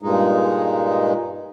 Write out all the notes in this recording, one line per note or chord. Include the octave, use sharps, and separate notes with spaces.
G2 A#2 G#3 D#4